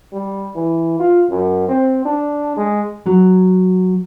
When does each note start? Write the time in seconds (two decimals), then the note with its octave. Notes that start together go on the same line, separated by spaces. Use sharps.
0.13 G3
0.55 E3
1.00 F4
1.30 F#2
1.69 C4
2.06 D4
2.57 G#3
3.06 F#3